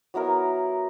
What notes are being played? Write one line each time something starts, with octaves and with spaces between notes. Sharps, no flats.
F#3 B3 E4 A#4